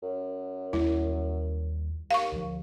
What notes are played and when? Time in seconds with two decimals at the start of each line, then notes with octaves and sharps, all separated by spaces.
0.03 F#2
0.73 D#2 G3 A#3 E4
2.11 D#2 F5 C#6
2.32 D2 F3